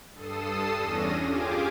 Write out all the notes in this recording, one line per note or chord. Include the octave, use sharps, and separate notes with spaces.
G2 A4 D#6 C7 E7
E2 C#4 D4 A#6 D#7
F4 G4 G#4 G#5 D6